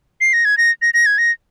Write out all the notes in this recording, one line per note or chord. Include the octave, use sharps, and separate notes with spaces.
C7
A#6
G#6
A#6
A#6
A#6
G#6
A#6